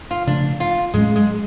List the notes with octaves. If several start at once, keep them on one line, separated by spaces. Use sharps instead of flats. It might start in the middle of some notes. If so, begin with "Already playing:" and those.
F4
C#3 F3 A3 D4
F4
A2 F#3 G#3 A3 C#4
G#3